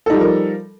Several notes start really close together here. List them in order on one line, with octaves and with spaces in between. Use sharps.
A4 D#4 G3 F3 A#4